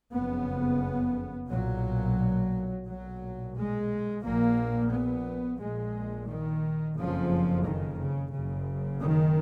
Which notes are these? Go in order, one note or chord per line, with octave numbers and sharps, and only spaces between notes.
F#1 F2 C#3 B3
B1 A#2 F#3
B1 A#2 F#3
G#3
A#1 A#2 A#3
B3
A#1 A#2 G#3
D#3
F#1 F2 C#3 F3
D#3
C#3
F#1 F#2 C#3
D#3